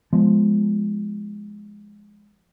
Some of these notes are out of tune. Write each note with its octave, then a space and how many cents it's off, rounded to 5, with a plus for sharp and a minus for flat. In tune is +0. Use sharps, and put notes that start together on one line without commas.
F3 +0 G#3 +0 B3 +0